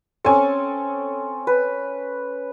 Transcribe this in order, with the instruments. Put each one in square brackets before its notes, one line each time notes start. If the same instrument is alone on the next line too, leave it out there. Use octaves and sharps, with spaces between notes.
[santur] C4 C#4 [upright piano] A4 G#5
[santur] B4